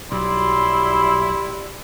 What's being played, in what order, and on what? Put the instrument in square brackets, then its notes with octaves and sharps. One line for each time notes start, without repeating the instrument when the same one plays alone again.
[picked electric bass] B1 [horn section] F#3 D5 C6 [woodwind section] G3 E4